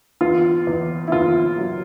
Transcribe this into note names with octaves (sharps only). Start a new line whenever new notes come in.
E2 F4
E2
E4
E2 F4
F#3